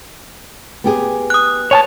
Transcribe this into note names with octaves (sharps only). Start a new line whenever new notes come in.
B3 G4 G#4
D#6 F#6
C#5 G#5 A5